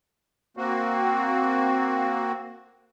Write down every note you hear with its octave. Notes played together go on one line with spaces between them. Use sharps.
A#3 C4 F#4